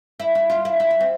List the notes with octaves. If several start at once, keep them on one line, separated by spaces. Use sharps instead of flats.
E4
E4
F4
E4
E4
E4
C4